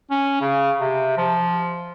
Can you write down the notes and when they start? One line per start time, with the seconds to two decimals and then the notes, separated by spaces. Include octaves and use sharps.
0.11 C#4
0.41 C#3
0.80 C3
1.18 F3